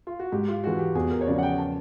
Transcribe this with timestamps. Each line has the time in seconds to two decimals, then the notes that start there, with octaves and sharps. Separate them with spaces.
0.07 F4
0.19 F#4
0.32 G#2 G4
0.48 F4
0.64 E3 G#3 F#4
0.79 G4
0.95 E2 G#4
1.11 A#4
1.21 C#5
1.27 C#3 F3 D5
1.38 F#5
1.43 G5
1.58 A5